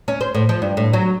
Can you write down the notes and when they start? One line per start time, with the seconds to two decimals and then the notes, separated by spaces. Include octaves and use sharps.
0.08 C#4
0.21 C5
0.35 A2
0.49 F3
0.62 G2
0.77 A2
0.93 F#3